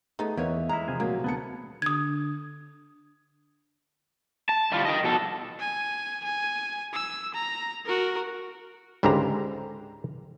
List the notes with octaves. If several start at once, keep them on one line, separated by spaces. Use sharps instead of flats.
A3 B3 D#4 G#4
E2 A#3 B4 C#5 D#5 E5
G#3 A#3 E4 A#5
C3 F3 G#4
A#2 F#3 A#3
D2 B3 A5 C#7
D3 D#6 G#6
A5
G3 F4
D#5 G5
B2 A4
G#5
G#5
E6
A#5
F#4 A#4
C#2 G#2 D3 G4 C5 A#5